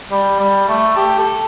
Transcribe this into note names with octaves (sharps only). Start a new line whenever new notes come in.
G3
G3
A3
G4
A4